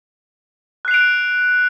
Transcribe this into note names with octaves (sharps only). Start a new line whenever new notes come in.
F#6 C7 D7 F7